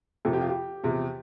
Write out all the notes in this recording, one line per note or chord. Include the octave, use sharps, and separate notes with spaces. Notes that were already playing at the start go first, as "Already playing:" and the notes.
F2 C3 F3 A4
G4
F4
G4
E2 C3 F3